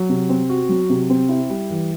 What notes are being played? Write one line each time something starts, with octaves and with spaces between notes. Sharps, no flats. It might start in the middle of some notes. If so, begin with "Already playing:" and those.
Already playing: F#3
C3
C4
F#4
F#3
C3
C4
E4
G3
E3